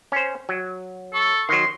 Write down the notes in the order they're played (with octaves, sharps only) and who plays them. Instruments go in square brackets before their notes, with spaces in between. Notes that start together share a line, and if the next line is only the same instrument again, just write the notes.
[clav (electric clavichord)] C#4 C5
F#3
[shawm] A4 [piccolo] C#6
[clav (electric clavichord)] D#3 F#3 [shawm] C6